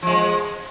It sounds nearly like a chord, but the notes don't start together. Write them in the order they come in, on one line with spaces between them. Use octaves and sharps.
F3 G#3 B3